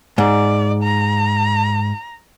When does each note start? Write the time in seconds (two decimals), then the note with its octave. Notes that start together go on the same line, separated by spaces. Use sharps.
0.18 G#2 D5
0.83 A#5